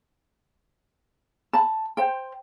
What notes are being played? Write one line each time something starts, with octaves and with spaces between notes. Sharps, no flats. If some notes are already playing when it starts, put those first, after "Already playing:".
A5 B5
C5 G5